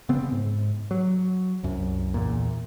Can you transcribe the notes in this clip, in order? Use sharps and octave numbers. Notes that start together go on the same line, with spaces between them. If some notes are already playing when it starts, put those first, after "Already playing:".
C#3 B3 C4
G#2
F#3
C2 F#2
E2 A#2